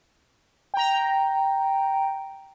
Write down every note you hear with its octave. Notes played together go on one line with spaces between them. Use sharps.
G5 A#5